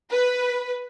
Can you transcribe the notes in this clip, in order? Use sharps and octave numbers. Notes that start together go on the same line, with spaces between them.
B4